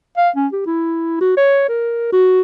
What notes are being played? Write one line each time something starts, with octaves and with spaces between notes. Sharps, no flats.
F5
C#4
G4
E4
F#4
C#5
A#4
F#4